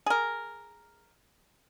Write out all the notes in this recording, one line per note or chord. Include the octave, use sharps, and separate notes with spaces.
G#4 A#4